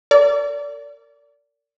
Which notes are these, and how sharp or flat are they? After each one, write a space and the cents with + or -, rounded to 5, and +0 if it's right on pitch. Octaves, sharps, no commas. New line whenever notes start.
A#4 -30 D5 -25